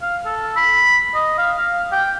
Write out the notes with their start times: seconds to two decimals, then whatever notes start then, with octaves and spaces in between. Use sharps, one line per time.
0.02 F5
0.26 A4
0.56 B5
1.15 D#5
1.38 F5
1.58 F5
1.92 G5